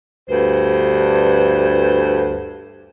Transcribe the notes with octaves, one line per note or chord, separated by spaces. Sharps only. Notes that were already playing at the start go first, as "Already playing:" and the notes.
D2 G2 B4 C5